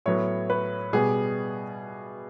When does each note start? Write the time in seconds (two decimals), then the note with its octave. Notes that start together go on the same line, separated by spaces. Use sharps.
0.06 A2 F#3 B3 C#5
0.50 B4
0.93 B2 G3 B3 G#4